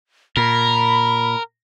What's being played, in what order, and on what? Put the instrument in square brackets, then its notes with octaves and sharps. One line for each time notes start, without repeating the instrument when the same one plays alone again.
[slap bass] A#2 [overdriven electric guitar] A#4 [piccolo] B5